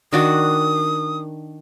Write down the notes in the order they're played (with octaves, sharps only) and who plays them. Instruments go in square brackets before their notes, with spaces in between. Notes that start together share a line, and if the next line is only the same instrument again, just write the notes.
[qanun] D#3 D4 F#4 [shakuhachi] D#6